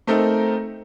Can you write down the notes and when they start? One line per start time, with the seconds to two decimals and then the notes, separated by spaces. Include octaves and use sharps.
0.07 A3 C4 D#4 A4 A#4